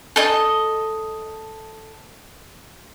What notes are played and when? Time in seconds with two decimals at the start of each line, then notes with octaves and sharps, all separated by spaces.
0.16 A4 D#5